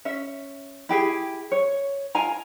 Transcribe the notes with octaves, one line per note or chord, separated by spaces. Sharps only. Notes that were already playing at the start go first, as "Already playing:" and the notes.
C#4 E5
E4 G4 G#4 G5
C#5
F4 A#4 G#5 A#5